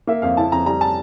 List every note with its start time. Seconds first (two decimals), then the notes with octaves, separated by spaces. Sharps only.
0.07 A#3 E5
0.22 F2 F5
0.37 E4 A5
0.52 F2 A#5
0.66 G3 A#5
0.81 A5